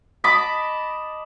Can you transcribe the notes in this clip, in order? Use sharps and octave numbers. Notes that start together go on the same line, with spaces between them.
D#5 A5 B5 D6